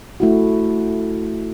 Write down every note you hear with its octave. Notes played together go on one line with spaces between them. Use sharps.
A3 E4 F#4